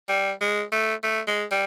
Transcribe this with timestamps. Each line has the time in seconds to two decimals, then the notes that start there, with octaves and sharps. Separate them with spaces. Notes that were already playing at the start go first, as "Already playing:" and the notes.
0.09 G3
0.41 G#3
0.72 A3
1.03 A3
1.28 G#3
1.51 G3